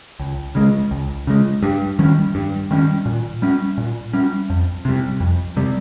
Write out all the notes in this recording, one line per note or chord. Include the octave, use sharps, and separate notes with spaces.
C#2
C#3 G#3
C#2
C#3 G#3
G2
D#3 G3 C#4
G2
D#3 G3 C#4
A#2
G3 C#4
A#2
G3 C#4
F2
C3 G3
F2
C3 G3